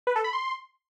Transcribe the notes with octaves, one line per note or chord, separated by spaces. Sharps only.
B4
A4
B5
C6